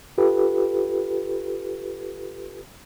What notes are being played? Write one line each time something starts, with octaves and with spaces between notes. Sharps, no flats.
F4 G4 A4 B4